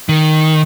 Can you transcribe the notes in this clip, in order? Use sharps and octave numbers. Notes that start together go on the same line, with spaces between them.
D#3